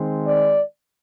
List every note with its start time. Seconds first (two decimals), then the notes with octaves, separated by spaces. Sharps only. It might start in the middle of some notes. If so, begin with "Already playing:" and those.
Already playing: D#3 G#3 C4
0.25 D5